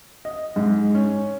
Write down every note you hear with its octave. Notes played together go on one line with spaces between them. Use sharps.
D#5
G#2
C#4